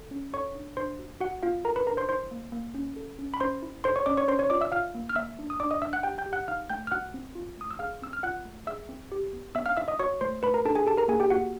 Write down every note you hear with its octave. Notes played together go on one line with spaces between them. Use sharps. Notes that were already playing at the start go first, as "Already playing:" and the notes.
Already playing: A4
C#4
A4 C#5 C#6
D4
D4 C5 C6
F#4
F#4 F#5
B3 F4 F5
A4 A#4 A#5
B4 B5
D4 A#4 A#5
C5 C6
E4 C5 C6
A#3
A#3
C#4
A4
C#4
B5
C#4 C5 C6
E4
A4 C5 C6
C#5 C#6
C#4 D5 D6
C#5 C#6
C#4 C5 C6
C#5 C#6
F4 D5 D6
E5 E6
F4 F5 F6
A#3
F6
A#3 E5 E6
D4
D#6
D4 D5 D6
D#5 D#6
D4 E5 E6
F#5 F#6
G4 G5 G6
G5 G6
G4
F#5 F#6
D#4 F5 F6
A3 G5 G6
F6
F#4 F#5 F#6
C4
F4
A3 D#6
E6
G#4 F5 F6
C4 E6
F6
F4 F#5 F#6
A3
G#4 E5 E6
C4
G4
B3
B3 E5 E6
F5 F6
E4 E5 E6
D#5 D#6
F#4 C#5 C#6
A3 C5 C6
A3 B4 B5
A#4 A#5
D4 A4 A5
G#4 G#5
G4 A4 A5
A#4 A#5
A#3 G#4 G#5
G4 G5
A#3 F#4 F#5